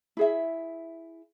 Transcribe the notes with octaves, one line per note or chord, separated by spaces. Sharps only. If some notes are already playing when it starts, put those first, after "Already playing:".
E4 G#4 E5